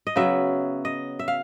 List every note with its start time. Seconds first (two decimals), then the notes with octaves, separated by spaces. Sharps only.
0.07 D#5
0.16 C#3 F#3 B3 E5
0.85 D#5
1.19 E5
1.28 F5